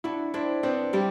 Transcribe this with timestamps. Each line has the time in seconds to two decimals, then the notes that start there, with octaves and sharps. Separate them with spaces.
0.04 D4 E4 F#4
0.34 C4 D4 E4
0.63 B3 C4 D4
0.93 G3 E4 G4